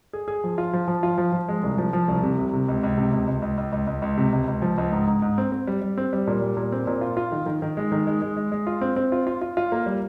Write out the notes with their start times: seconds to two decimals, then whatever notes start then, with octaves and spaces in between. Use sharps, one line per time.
0.13 G#4
0.28 G#4
0.44 F3
0.58 F4
0.73 F3
0.88 F3
1.03 F4
1.18 F3
1.32 F3
1.48 G#3
1.63 C2
1.78 F3
1.93 F3
2.08 C2
2.23 C3
2.38 C2
2.53 C3
2.68 C#2
2.83 C#2
2.98 C3
3.13 C#2
3.27 C#2
3.42 C#2
3.58 C#2
3.72 C#2
3.87 C#2
4.02 C#2
4.18 C3
4.33 C#2
4.48 C#2
4.62 F3
4.78 C#2
4.92 G#2
5.07 G#2
5.22 G#2
5.38 C4
5.52 C4
5.67 G3
5.82 G3
5.97 C4
6.13 G3
6.27 A#2
6.42 G3
6.57 A#2
6.72 C4
6.87 A#2
7.01 F4
7.17 F4
7.32 D#3
7.46 D#3
7.62 D#3
7.77 G#3
7.92 D#3
8.07 G#3
8.22 G#3
8.37 G#3
8.52 G#3
8.67 F4
8.81 C4
8.96 C4
9.12 F4
9.27 F4
9.41 F4
9.57 F4
9.72 A#3
9.86 G3